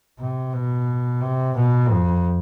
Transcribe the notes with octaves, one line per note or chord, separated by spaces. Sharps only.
C3
B2
C3
B2
F2